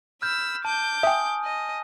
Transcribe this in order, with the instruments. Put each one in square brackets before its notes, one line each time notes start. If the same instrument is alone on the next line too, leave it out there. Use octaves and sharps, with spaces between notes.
[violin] B5 E6 [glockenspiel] F6 G6
[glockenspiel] A5 [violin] D6 G6
[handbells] E5 G5 [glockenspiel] G#5 D#6
[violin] D#5